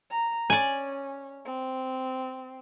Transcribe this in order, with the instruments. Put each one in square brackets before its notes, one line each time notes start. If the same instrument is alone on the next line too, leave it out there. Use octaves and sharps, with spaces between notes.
[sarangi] A#5
[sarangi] C#4 [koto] D5 G#5
[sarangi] C4